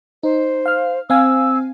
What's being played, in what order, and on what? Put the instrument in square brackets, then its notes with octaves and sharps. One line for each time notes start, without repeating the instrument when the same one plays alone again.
[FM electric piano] D#4 [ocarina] C5
[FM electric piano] F5 F6
[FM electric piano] C4 F5 G#5 [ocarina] E6